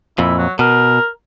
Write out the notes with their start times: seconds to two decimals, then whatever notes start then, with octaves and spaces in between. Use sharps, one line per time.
0.18 F2 A#2 E4
0.38 F#3
0.59 B2 A#4